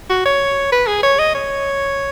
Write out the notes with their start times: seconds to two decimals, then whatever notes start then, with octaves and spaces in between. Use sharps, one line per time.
0.10 F#4
0.26 C#5
0.72 B4
0.87 G#4
1.03 C#5
1.19 D#5
1.35 C#5